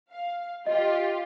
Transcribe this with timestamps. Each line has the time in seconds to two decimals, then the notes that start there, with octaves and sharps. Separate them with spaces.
0.11 F5
0.66 F4 G4 D#5